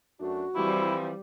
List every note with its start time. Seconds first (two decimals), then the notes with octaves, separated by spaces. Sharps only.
0.20 F#2 A3 D4 F#4
0.56 E3 F3 G3 C4 E4